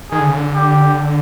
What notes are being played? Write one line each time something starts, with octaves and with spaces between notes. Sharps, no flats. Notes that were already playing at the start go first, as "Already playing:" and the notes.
D#3 G#4
D3
C#3
D3
G4